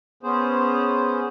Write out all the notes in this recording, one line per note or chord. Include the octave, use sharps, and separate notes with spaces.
B3 C#4 G#4 C5